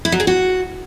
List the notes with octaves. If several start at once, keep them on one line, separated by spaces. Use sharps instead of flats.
E4
F#3
G#4
F#4